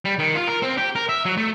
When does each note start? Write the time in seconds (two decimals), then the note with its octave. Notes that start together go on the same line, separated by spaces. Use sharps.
0.05 G3
0.19 D#3
0.35 F4
0.48 A#4
0.62 C4
0.78 G4
0.95 A#4
1.09 E5
1.25 F#3
1.37 A3